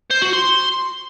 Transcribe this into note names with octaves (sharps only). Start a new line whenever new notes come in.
C5
F#4
C6